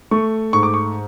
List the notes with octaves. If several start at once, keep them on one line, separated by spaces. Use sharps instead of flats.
A3 C#6
G#2 C#6
D6
C#6